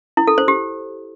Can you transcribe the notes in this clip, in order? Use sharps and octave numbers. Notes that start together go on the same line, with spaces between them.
E4
A4
C5
G4